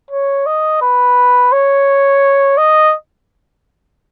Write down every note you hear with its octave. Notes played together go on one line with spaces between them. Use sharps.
C#5
D#5
B4
C#5
D#5